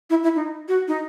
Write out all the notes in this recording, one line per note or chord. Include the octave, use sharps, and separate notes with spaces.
E4
E4
D#4
F#4
D#4